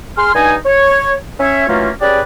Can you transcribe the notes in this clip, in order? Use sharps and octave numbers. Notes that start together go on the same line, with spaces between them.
G#4 C6 F6
G2 D#4 G#5
C#5
C#4 C#5 E5
E3 F#3 A3 A#3 C#4 F4
C#4 G4 G#4 B4 D5